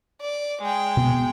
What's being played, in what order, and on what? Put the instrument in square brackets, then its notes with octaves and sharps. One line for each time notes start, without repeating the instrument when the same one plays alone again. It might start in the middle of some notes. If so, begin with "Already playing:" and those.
[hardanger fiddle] D5
G#3 G5
[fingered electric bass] B2 B3